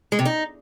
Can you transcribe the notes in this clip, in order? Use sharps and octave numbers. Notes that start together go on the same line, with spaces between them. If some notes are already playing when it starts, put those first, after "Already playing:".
G#3
C3
D#4